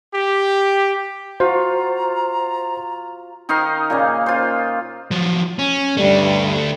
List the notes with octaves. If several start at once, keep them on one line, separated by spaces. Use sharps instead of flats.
G4
F4 F#4 C5 A#5
D#3 D#4 D#5 F5
A#2 C#3 A#3
F4 C5
F3 F#3
C#4
G2 D3 G3 A3